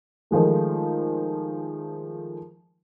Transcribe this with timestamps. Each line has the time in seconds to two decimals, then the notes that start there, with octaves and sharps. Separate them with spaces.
0.31 D#3 F3 G#3 A3